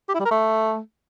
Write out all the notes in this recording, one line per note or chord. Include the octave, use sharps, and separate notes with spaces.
G4
E4
G3
A#4
A3